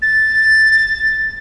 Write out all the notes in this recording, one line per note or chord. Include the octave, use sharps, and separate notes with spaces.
A6